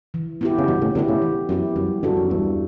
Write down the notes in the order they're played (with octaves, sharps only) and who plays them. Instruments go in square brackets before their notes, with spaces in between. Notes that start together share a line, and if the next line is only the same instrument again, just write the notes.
[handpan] E3
B3 E4 G4
[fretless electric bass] C#3
[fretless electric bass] G2 B2 [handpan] E3
[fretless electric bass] A2 C#3
[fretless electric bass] B2 D3 [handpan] B3 E4 G4
[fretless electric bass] A2 C#3
[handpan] E3
[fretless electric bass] F#2 [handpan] B3 E4 G4
[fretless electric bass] F#2 [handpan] G3
[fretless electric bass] G2 [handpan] D4 F#4 A4
[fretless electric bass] F#2
[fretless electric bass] E2 G2 [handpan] G3